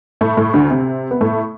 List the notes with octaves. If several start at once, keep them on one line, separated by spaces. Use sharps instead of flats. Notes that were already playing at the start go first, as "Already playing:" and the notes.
A2 A3
A2 A3
D2 D3
C3
B3
A2 A3